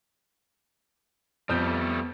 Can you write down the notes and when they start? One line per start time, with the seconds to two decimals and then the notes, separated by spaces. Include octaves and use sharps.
1.49 F2 G3 A3 B3 G6